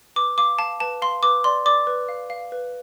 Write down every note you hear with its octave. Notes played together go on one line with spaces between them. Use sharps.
B4 D6
F5 D6
F5 A5
B4 A5
F5 C6
B4 D6
D5 C6
D5 D6
B4
F5
F5
B4